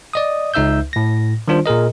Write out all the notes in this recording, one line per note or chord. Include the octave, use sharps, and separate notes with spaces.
D5 D#5 D#6
C#2 D#4 E5 E6 G6
A2 A#6
D#3 G3 D4 F4 C5
A#2 G#4 A#4 D#5